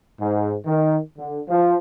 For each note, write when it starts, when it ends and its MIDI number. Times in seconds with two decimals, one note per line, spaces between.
0.20 0.55 44
0.66 0.98 51
1.18 1.40 50
1.49 1.76 53